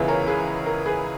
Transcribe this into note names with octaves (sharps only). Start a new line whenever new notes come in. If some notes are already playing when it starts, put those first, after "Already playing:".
Already playing: C#2 C#3 E3 B3 E5 G#5
A#4 C#5
G#4 B4
A#4
G#4 B4